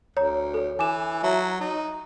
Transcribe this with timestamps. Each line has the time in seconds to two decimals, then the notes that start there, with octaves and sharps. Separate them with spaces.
0.17 D2 C#5 A#5
0.54 A4 C#5
0.79 E3 G#5 D6 E7
1.23 F#3 E5 A5 A#5
1.60 D#4